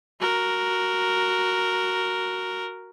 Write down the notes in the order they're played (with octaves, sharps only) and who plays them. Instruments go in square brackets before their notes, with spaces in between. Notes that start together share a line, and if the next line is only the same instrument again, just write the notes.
[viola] F#4 A#4